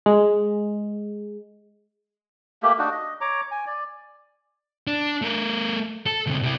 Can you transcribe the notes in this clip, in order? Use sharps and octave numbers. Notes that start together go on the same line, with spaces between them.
G#3
A3 A#3 G4
D4 D#4 F#4
D#5
C#5 A#5 D6
G#5
D5
D4
A3 A#4
A4
D2 C3
C3 E4